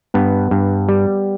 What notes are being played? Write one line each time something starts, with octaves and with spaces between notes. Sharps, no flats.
G2 B3
G2
G3